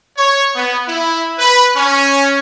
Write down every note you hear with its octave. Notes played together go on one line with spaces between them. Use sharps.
C#5
B3
E4
B4
C#4